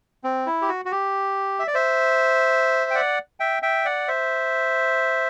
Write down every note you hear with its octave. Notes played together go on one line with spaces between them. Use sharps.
C4
E4
G4
F#4
F#4
G4
E5
D5
C5 E5
G5
D5 F#5
E5 G5
E5 G5
D5 F#5
C5 E5